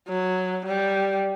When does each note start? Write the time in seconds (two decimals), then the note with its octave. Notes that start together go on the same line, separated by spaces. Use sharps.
0.08 F#3
0.65 G3